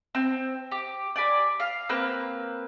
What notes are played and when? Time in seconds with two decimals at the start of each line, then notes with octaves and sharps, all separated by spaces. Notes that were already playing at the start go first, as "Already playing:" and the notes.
0.15 C4
0.71 G4
1.16 D5 G#5 B5
1.60 F5
1.89 A#3 C4 B4